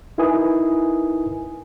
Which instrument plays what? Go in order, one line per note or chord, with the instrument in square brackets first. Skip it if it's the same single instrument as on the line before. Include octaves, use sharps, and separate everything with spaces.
[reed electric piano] D#4 E4 A#4 B4 G#5 D#6